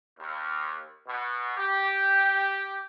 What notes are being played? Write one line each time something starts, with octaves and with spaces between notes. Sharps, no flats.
D#2
B2
G4